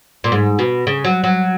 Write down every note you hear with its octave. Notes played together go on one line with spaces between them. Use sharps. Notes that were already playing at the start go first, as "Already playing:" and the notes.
A#2
G#2
B2
C#3
F#3
F#3